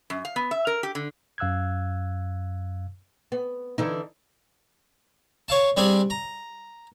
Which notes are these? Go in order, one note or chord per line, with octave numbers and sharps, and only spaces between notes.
F#2
F5
B3
E5
A#4
G4
D3
F#2 F5 E6 F#6 G#6
B3
D3 E3 D#4
C#5 F5 A5
G3 C4 D4 G4 G#4
A#5